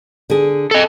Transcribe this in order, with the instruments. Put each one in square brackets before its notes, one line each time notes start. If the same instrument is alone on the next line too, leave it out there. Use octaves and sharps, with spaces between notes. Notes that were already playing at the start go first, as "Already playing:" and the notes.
[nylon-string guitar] D3 G#4
[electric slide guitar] A4 D#5